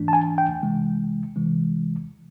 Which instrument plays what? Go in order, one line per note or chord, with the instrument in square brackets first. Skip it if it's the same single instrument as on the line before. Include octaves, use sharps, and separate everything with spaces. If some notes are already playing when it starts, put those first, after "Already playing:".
Already playing: [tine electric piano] G#2 E3 A3 D4
A5
G#5
G5
C3 E3 G#3
C3 E3 G#3